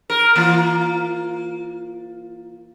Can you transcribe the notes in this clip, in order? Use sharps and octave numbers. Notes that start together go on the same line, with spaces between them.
A#4
E3 A#3 F4